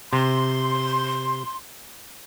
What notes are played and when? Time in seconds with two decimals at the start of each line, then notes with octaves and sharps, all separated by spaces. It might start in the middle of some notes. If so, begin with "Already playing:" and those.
0.13 C3 C6